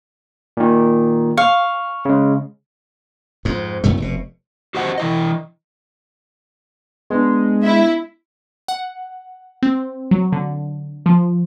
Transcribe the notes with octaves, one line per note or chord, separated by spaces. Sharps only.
A#2 D#3
F5 C#6 F6
C#3 G#3
F2 G#2
B1 F#2 A2 A3
F1 B2
F#4 G4 C5 D#5 F#5
E3 E4 D#5
G#3 B3 D4
E4 E5
F#5
C4
F#3
D3
F3